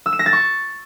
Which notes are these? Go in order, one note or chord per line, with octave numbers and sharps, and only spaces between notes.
E6
E7
A#6
A6
C#6